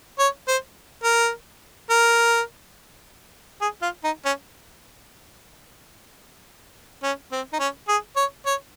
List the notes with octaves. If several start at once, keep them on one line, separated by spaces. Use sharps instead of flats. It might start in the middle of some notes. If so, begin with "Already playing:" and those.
C#5
C5
A#4
A#4
G#4
F4
D#4
C#4
C#4
C4
D#4
C#4
G#4
C#5
C#5